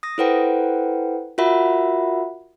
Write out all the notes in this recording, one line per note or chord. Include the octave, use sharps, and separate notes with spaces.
D#6 A#6
E4 A4 B4 C5 F#5 G5
F4 F#4 A#4 E5 F#5 B5